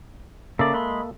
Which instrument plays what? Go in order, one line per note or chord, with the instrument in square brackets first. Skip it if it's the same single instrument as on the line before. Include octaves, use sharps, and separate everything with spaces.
[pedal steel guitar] C#3 D5 [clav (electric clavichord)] A#3 A4 E5
[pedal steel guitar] G#3 B5 C6